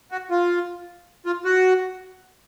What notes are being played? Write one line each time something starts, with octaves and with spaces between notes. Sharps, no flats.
F#4
F4
F4
F#4